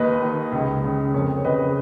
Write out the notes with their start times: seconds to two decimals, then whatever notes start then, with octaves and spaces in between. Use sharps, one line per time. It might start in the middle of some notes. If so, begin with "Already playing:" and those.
Already playing: D#2 B4 D#5
0.22 D#3
0.52 C#2
0.84 C#3
1.14 F2 A#4 C#5
1.45 C#3 B4 D#5